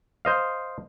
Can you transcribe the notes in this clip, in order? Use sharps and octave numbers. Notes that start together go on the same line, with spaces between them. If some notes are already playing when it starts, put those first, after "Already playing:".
C5 D#5 F5